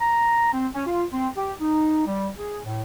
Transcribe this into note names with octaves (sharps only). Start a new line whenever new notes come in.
A#5
C4
C#4
F4
C4
G4
D#4
G3
G#4
A2